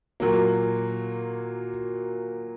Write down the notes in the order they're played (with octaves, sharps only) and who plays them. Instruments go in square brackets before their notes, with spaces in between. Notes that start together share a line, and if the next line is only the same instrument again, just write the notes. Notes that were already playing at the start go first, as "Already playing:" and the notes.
[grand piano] A#2 F#3 A#3